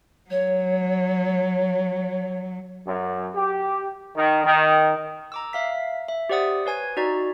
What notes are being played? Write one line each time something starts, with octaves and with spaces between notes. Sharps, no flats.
F#3 C#5
F#2
G4
D#3
D#3
A#5 D6 E6
E5 F5 B6
E5
G4 C5 D5 F#5 D#6
B4 C#5 G#5 G#6
D#4 F#4 D5 A#5